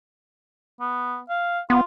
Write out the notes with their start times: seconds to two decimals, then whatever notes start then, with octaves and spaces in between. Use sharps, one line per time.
0.81 B3
1.29 F5
1.70 B3 F4